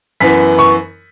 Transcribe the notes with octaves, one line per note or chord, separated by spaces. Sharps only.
F#2 E3 B3 B6
C#6